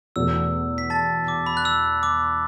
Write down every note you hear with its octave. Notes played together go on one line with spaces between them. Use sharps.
E2 B2 A3 E6
B6
A5 A6
D6
B5
F#6
E6
D6